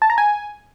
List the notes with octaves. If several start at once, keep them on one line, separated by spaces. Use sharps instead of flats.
A5
A#5
G#5